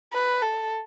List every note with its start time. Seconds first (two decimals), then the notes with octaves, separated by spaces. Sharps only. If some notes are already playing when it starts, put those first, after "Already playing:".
0.13 B4
0.42 A4